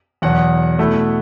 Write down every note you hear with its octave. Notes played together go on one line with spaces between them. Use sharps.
E2 B2 F#3 F#5
B2 A3 E4